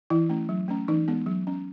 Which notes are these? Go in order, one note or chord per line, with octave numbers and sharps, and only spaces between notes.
E3 E4
A3 C#4
F#3
A3 C#4
E3 D#4
G#3 B3
F#3
C#4